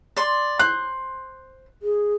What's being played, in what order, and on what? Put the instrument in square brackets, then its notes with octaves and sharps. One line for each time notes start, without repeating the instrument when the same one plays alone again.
[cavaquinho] D5 C6
[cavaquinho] C5 [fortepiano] F#6
[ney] G#4